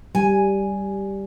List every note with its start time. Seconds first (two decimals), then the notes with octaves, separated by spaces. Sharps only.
0.15 G3 G#5